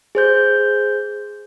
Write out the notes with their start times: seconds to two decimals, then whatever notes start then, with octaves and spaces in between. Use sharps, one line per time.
0.15 G#4 C5 G6